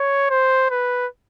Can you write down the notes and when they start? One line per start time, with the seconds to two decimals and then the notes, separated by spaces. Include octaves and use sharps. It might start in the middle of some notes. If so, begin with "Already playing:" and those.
Already playing: C#5
0.30 C5
0.70 B4